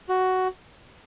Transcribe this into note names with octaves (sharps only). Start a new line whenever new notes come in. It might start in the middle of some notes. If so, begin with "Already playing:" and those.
F#4